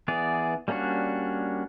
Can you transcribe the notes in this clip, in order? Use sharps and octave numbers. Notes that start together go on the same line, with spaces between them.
E3 B3 G#4 D5
G3 A#3 C#4 D4 F#4